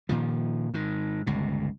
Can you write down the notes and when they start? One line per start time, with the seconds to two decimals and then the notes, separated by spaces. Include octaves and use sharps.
0.09 A#2 D#3 F3
0.74 G#2 D#3
1.27 G1 C#2 B2